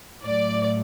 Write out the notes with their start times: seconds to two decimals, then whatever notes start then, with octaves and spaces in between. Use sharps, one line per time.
0.23 A2 F#3 D5